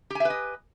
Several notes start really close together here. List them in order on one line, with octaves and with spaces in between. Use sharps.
G4 G#5 E5 B4 D#5